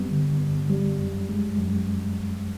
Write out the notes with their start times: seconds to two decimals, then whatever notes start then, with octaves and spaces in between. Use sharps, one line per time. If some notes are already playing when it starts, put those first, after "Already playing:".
Already playing: G2 G3 B3
0.11 D3
0.40 G2
0.69 G3
0.99 F#2
1.29 G#3
1.58 F#2